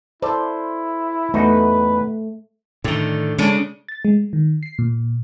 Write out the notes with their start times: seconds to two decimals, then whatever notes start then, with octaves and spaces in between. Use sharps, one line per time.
0.22 E4 A4 C5 D5 A5
1.34 E2 A3 D#4 F#4 B4
2.84 A2 D3 D#3
3.38 C#3 G#3 C#4 D4
3.88 A6
4.05 G#3
4.33 D#3
4.63 C7
4.79 A#2